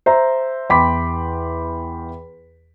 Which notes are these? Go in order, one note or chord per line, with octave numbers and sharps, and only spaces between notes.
C5 E5 A#5
E2 G5 B5 C6 D6 B6